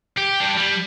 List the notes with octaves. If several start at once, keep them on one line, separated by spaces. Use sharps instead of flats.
G4
G3 D4
G3